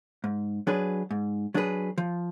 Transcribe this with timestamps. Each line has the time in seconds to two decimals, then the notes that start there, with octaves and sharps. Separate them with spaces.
0.24 G#2
0.67 F#3 D4 G#4 B4
1.11 G#2
1.54 F#3 D4 G#4 B4
1.98 F3